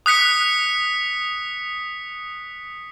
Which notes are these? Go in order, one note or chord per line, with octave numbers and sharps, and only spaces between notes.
D#6 F#6 B6 C#7